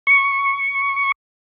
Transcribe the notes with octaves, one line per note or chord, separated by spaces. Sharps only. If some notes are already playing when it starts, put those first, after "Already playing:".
C#6